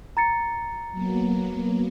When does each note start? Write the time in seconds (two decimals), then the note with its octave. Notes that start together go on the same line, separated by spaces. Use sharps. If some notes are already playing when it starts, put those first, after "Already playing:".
0.17 A#5 A6 C#7
0.92 F#3 A#3 B3